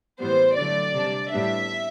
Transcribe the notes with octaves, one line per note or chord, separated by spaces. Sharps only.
A2 E3 G3 B3 C5
D3 F#3 A3 D5
C3 G3 D4
A2 G3 B3 D4 E5